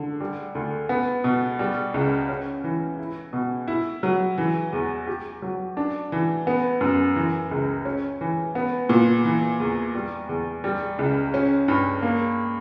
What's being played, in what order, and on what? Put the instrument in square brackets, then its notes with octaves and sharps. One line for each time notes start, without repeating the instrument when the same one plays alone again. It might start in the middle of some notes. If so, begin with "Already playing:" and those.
Already playing: [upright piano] D3
G3
D2
B3
B2
G3
C#2
C#4
E3
E4
B2
E4
F#3
E3
E2
G4
F#3
D4
E3
B3
F#2
E3
C#2
C#4
E3
B3
A#2
E3
E2
G3
E2
G3
C#2
C#4
G2
A#3